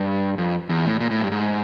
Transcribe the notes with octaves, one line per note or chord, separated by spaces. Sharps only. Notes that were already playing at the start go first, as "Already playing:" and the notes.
Already playing: G2
F2
E2
A2
A#2
A2
G2
G#2